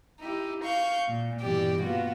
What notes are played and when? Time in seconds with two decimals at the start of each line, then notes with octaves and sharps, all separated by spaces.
0.20 D#4 E4 G4
0.63 F5 C#6 G6
1.07 A#2
1.40 G2 B2 E3 G3 G4 D5
1.82 A#3 B3 F4 F#4